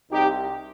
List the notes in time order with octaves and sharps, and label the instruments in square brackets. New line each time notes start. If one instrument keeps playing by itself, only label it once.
[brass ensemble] C2 C3 D#4 G4